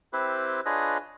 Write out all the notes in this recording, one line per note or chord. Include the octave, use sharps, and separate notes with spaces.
C4 E4 G4 B4 C5
D4 F4 G#4 B4 C#5 D#5